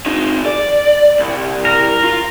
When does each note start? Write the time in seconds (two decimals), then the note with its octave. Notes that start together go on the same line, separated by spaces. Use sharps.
0.06 C4 D#4
0.46 D5
1.20 C2
1.65 A#4
2.04 F4